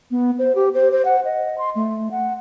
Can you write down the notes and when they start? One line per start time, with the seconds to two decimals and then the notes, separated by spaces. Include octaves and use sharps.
0.11 B3
0.39 C5
0.55 G4
0.74 C5
0.91 C5
1.05 F#5
1.25 D#5
1.58 C6
1.75 A3
2.11 F#5